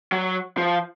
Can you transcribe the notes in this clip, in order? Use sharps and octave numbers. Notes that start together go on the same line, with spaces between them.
F#3
F3